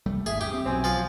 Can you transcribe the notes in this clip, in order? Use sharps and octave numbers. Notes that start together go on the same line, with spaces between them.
C2 G3 A3
G#1 D#2 G#4 E5
G2 G4 D#6
C4
B1 B2 F#3 C4 G#5
F3 F5